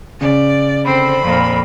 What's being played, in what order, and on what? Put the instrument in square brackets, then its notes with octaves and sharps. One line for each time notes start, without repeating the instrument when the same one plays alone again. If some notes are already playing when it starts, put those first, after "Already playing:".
[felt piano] C#3 [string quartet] D5
[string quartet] D3 C5 [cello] C4 [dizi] B5
[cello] F2 A#2